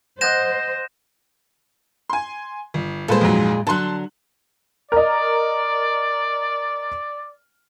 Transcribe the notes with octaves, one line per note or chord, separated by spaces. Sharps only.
C5 D#5 F#5 G#5 G6 A#6 E7
G#5 C6
G1
A#2 G#3 A4 B4 C5
F2 G#2 F#3
D3 F#3 A5 C6 F#6
A#4 D5 D#5